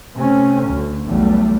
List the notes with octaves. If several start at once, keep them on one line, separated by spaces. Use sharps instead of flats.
C3 A3 C#4
D2
B1 E2 G3 A3